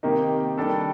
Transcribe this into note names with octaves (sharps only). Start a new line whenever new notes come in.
C3 D#3 A#3 D#4 G4
D#3 G3 D4 A4